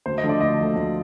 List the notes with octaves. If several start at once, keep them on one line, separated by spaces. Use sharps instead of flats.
D2 C5
D#5
D3 F3 A3
D5
D2 D#5
D3 F3 A3
D2